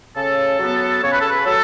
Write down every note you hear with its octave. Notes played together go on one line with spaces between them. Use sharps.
C#3 A4
F#3 B3
C#3 C#5
B4
A4
B4
F#3 A4